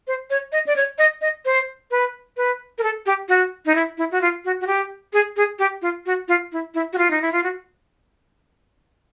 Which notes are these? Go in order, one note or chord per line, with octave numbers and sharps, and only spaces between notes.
C5
C#5
D#5
D5
C#5
D#5
D#5
C5
B4
B4
A#4
A4
G4
F#4
D#4
E4
E4
F#4
F4
F#4
F#4
G4
G#4
G#4
G4
F4
F#4
F4
E4
E4
F#4
F4
D#4
E4
F4
F#4